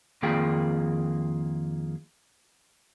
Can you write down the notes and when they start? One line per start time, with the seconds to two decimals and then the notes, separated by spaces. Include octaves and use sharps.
0.22 F2 D#3 A#3 F4 G#4 G5